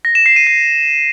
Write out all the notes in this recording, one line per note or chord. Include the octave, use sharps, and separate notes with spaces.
A#6
E7
C7
D#7
C7